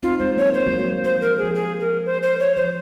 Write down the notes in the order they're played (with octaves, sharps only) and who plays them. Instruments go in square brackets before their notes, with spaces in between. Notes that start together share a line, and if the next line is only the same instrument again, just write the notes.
[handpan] C4 D#4 [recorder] F4
[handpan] G#3 C4 [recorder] C5
[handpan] F#3 A#3 [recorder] C#5
[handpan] G#3 [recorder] C5
[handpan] F#3 A#3
F#3 A#3
G#3
[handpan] F#3 [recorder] C5
[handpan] F3 [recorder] A#4
[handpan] F3 [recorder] G#4
[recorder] G#4
A#4
C5
C5
C#5
[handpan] F3 [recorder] C5